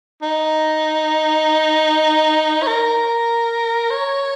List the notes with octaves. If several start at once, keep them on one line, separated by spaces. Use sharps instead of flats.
D#4
C#5
A#4
C#5